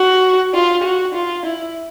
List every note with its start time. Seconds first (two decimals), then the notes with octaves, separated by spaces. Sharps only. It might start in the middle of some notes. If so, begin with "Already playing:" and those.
Already playing: F#4
0.54 F4
0.84 F#4
1.15 F4
1.45 E4